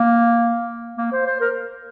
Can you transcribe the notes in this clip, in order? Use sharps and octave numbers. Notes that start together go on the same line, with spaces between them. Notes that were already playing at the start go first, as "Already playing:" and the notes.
Already playing: A#3
A#3
C5
C5
A#4